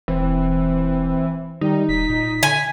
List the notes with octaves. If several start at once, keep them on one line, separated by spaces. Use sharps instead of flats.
E1 E3 C4
D#3 G3 D#4
D#1 B6
A#2
D3 G#5